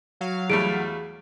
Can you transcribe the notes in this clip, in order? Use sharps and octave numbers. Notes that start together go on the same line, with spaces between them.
F#3 F5
E2 G3 A3 G#4 D7